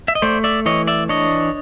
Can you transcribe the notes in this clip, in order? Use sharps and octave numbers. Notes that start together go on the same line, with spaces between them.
E5
D#5
A3 C5 D5
D5 E5
E3 C#5 D#5
D5 E5
D4 C#5 D#5